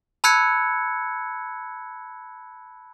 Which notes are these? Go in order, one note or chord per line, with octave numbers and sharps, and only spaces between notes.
A5 B5 E6 F#6 G#6 C#7